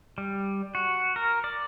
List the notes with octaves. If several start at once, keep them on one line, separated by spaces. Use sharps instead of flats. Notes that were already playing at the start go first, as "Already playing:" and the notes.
G3
F#4
A#4
D5